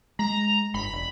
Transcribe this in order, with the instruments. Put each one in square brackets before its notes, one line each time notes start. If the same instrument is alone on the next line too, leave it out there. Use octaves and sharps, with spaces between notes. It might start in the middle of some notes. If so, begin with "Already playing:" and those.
[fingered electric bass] G#3 [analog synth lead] A#5
[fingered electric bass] G1 [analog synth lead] B5
[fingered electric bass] E1